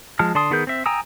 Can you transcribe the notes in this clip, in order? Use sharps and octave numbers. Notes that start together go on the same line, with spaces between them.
F3 G#3 A5 F6
D3 D5 A5 C6 D#6
D#3 B3 G#4 A#4 G6
C4 E5
G5 G#5 A#5 D#6 E6